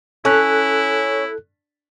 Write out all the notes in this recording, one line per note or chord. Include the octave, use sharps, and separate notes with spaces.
C#4 E4 A4 F#6